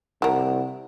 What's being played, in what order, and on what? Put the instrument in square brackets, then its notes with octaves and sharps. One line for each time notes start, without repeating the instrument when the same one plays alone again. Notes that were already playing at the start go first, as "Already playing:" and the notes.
[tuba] C2 [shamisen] E4 A#4 [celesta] F#5